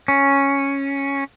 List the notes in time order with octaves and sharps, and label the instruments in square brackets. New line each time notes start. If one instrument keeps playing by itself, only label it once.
[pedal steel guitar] C#4